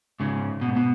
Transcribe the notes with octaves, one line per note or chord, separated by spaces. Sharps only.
G#2 C#3
B2
G#2
B2